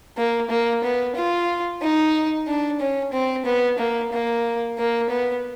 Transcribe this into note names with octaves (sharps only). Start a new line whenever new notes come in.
A#3
A#3
B3
F4
D#4
D4
C#4
C4
B3
A#3
A#3
A#3
B3